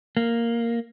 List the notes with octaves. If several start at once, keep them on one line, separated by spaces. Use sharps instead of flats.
A#3